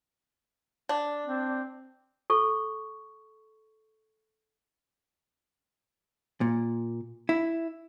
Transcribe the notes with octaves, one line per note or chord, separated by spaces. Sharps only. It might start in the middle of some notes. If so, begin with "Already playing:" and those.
D4
C4
A4 C#6
A#2
E4